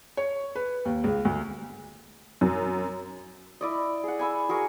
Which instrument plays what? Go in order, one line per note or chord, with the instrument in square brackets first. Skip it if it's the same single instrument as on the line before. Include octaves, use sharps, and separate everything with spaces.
[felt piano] C#5
B4
D#2
C#2
D2
[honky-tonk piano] F#2
[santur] E4 D5 D#5
G#4 F#5
G#5 B5 E6
F#4 G#4 A#4 C#6